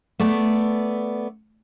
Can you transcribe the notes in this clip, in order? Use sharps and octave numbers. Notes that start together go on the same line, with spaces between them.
A3 B3 D5